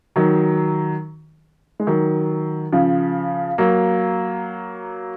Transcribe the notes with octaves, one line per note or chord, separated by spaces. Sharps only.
D#3 F#3
G#3
D#3 F#3
C#3 F3
F#3 A#3